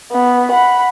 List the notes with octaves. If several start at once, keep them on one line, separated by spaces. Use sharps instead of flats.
B3
F#5 B5